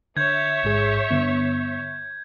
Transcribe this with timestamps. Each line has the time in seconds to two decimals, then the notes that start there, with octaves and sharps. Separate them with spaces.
0.17 D3 C#5 E5 G6 G#6
0.63 A1 G#2 G#4
1.11 G2 D3 B3